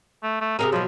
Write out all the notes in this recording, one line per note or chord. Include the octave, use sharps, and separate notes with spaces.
A3
A3
C3 C4 G#4 A#4
B2 F3 F#3